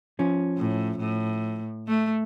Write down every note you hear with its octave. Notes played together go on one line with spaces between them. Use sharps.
F3 C#4
A2
A2
A3